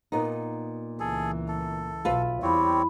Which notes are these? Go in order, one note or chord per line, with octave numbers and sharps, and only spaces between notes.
A#2 B3 D#4
C#2 E3 G#4 A4
A4
B1 F4 B4 E5
E2 G3 C4 E4 C#5 B5